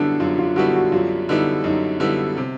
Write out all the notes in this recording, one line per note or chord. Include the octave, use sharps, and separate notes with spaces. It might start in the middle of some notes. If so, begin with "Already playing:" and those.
Already playing: F#2 D3 G3 B3 D4 E4
F#2 F4
F4
D3 G3 B3 E4 F#4
F#4
F#2 F4
D3 G3 B3 D#4 E4
F#2 D#4
D3 G3 B3 E4
C3